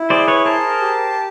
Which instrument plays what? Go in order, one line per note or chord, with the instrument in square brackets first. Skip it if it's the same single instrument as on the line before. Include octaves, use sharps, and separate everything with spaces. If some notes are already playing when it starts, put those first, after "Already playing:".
Already playing: [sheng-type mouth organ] E4
[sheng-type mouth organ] G#4 [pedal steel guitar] C5 D5
[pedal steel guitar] B4 C#5
[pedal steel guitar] A#4 C5 [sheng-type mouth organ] A5
[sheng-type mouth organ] G4